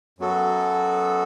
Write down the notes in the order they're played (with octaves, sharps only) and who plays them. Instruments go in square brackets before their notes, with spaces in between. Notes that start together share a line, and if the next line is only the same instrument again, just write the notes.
[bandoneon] F#2 F#3 B3 F#4 A4